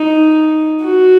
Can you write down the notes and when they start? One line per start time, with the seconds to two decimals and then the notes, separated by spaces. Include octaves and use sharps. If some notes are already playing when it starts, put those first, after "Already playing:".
Already playing: D#4
0.84 F#4